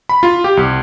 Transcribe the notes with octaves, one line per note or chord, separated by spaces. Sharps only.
B5
F4
G4
C2